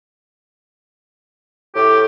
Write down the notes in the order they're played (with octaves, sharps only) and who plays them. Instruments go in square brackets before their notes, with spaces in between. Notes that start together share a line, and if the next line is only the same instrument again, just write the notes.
[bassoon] A2 [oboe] G4